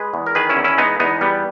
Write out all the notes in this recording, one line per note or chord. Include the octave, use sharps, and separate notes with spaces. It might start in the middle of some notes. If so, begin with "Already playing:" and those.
Already playing: G#3 G#4 B4
E2
A#4
D#3 G#4 B4
C#4 E4
E2
C#4 E4
G#3 B3 D#4
E2 B3 D#4
G3 B3